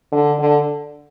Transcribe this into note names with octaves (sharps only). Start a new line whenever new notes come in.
D3
D3